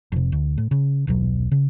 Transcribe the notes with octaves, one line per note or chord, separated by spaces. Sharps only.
F1 C3
D2
A2
C#3
D#1 B1 B2 F#3
C#3